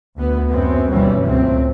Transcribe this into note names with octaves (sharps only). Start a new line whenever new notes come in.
D2 B3
F#2 B3 C4
G1 D#2 B2 E3 G3 C#4
C#2 A2 F#3 C4